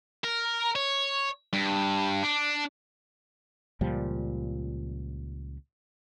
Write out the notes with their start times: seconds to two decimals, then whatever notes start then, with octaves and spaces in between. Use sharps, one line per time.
0.24 A#4
0.76 C#5
1.53 G2
2.23 D4
3.81 C#2 A#2 F3 G3